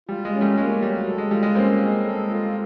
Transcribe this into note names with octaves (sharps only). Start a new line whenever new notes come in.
G3 F4
G#3
C#4
G3 A3
G#3 A#3
F#3 G3
A4
G#3
G3 F4
G#3
A#3 C4 C#4
G#3
A4
F4